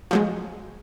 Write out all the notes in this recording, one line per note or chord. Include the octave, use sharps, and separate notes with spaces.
F3 F#3 G#3